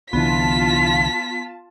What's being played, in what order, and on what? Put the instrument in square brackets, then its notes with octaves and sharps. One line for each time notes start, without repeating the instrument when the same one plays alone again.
[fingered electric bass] C2 D3 E3 [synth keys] B3 [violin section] F4 A5 [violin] B6